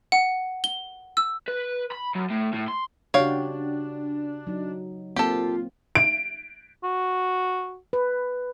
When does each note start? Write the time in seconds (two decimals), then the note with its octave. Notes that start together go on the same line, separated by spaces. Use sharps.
0.12 F#5
0.64 G7
1.17 E6
1.48 B4
1.91 B5
2.15 F#2
2.30 A2
2.53 A2
2.68 C6
3.14 C#3 D4 F#4 G4 C#5 F5 G5
4.47 F#3 D#4
5.16 A#3 C4 F4 G4 A4
5.95 D7
6.84 F#4
7.93 B4